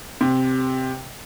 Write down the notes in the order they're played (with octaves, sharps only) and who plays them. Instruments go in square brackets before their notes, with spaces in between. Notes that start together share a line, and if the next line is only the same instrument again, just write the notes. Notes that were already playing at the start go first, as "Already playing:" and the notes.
[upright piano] C3